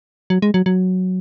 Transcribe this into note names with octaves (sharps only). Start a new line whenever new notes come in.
F#3
G#3
F#3
F#3